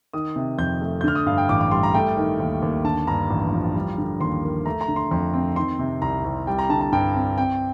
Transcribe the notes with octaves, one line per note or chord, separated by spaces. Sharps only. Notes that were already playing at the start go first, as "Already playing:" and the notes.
D#3 D#6
C3
F2 G6
A3
G6
D3 F6
D#6
G2 F5
G5
A1 D6
D6
G3 C6
A#5
A3 G5
D#3
D#2
D#2
D3 A5
G2 A#5
A1
F3
G3
D3
D#2 C6
A#3
A3 A#5
A#5
D3
C6
F2 C6
C4
D#3 C6
C3
C2 A#5
C2
G3 G5
A#5
D3 A5
A5
G2 G5
C4
C4 G5